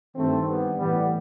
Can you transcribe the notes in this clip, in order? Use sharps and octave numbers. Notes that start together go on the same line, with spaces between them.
G2 D#3 A3 C4
G3 B3
A2 E3 G3 B3